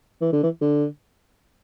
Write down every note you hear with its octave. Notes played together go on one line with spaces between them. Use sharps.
E3
D3
E3
D3